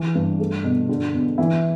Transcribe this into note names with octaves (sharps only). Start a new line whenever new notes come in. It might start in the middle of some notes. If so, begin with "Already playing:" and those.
Already playing: E3
G2
A3
B2
D3
E2
E3 E4